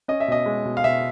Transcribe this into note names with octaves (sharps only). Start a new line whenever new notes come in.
C#4 D#5
E5
B2 D#5
G#3
B2
F5
B2 E5